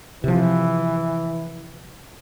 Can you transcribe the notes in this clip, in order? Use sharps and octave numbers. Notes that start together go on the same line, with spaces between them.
C3 E3 F3